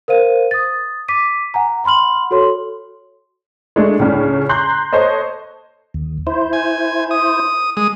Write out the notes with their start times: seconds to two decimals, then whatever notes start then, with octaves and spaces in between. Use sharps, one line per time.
0.08 A#4 C5 F5 D#7
0.51 D#6 A6
1.08 D6 B6 D#7
1.54 F#5 G#5 A#5
1.84 F#5 B5 C6 F6 F#7
2.31 F#4 A4 C#5 C6
3.76 G#3 A3 D4
3.99 C#2 A2 C#3 D4
4.49 A#5 C6 F#6 G6
4.93 A4 C5 C#5 D#5
5.94 D#2
6.27 E4 C5
6.53 G#5
7.11 D#6
7.77 G#3 D#6